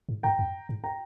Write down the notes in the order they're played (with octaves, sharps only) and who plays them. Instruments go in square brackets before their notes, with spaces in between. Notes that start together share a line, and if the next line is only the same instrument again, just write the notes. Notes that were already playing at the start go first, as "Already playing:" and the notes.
[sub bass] G#2
[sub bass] G2 [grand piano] G5 A#5
[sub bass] F2
G#2
[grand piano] G5 A#5